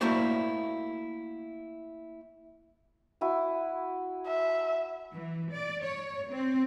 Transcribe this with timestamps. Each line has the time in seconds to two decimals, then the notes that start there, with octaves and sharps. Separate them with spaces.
0.01 A3 A#3 E4 F#4 C5 D5
3.21 E4 F#4 G#5
4.27 E5
5.13 E3
5.53 D5
5.83 C#5
6.30 C4